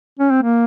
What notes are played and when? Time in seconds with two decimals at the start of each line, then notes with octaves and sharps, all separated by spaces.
0.19 C#4
0.31 C4
0.43 A#3